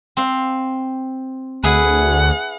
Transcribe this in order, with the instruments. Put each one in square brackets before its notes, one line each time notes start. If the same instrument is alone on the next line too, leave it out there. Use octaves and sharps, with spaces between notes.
[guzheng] C4 F5
[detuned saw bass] D2 [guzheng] E4 G#4 B4 [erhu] F#5